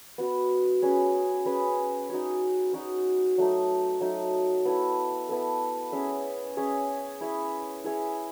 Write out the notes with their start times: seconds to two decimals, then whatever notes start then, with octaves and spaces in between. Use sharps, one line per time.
0.18 B3 F#4 C#5
0.82 C#4 G#4 B4
1.45 C#4 G#4 B4
2.09 D#4 F#4 C#5
2.73 D#4 F#4 C#5
3.38 F#3 A3 D#4
4.01 F#3 A3 D#4
4.65 B3 E4 A4
5.29 B3 E4 A4
5.92 C#4 G#4 C#5 E5
6.57 C#4 G#4 C#5 E5
7.21 E4 G#4 C#5 E5
7.84 E4 G#4 C#5 E5